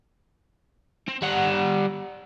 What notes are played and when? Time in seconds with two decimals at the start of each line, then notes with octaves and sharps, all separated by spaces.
1.08 C4
1.22 G3 F#5